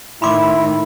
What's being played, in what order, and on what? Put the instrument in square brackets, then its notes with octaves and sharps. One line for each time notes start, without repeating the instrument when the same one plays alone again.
[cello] A2 D#3 [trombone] E4 [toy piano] B5 C6 D6